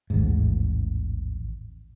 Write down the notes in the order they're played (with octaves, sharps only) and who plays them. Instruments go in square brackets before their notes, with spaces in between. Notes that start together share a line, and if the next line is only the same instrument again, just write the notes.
[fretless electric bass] A1 D#2 G#2